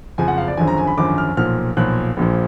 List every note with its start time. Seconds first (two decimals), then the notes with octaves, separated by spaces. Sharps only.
0.18 F#1 F2 F3 G#5
0.28 F#5
0.38 F5
0.48 D5
0.57 G#1 F#2 D3 F3 G#5
0.68 A#5
0.78 G#5
0.87 B5
0.98 G#1 F#2 D3 F3 D6
1.18 F6
1.37 B1 A#2 F3 F6
1.77 B1 A#2 F3 F#6
2.17 A#1 A#2 F3